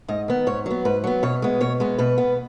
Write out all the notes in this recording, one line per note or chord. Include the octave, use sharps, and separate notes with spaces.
G#2 D#5
D#3 B3
G#2 C#5
F#3 B3
G#2 B4
F#3 B3
B2 C#5
G#3 B3
B2 C#5
G#3 B3
B2 B4
B3